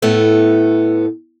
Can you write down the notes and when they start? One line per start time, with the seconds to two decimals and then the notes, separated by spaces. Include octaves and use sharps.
0.02 A2 A3 B3